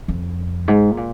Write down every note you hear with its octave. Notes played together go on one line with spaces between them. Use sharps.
F2
G#2
A#2